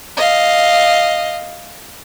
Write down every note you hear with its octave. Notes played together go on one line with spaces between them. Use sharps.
D#5 F5